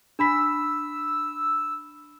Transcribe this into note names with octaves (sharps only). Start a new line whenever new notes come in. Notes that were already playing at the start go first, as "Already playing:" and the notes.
D4 B5 E6 B6